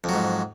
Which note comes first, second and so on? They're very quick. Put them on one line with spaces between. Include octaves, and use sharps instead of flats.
F2 F#3 G#2